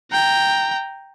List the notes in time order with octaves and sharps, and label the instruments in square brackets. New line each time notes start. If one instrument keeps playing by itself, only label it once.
[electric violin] G5 A#5